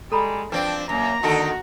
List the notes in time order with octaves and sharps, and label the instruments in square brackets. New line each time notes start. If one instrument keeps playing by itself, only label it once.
[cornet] G3 [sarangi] G#3 [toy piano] A4 A#5 B5
[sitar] F3 C4 [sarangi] D4 [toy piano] B4 [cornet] G5
[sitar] F#2 [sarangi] A#3 [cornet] A#5
[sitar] D3 D#3 A4 [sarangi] F#4